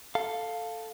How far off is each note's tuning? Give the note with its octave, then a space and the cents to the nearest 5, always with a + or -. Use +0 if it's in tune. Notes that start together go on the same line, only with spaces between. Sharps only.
A4 +5 F5 +5